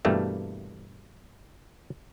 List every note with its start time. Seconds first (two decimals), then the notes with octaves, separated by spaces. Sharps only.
0.05 G2 B2 E3 G3 A3 A#3